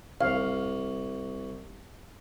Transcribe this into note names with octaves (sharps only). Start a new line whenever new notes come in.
C2 F5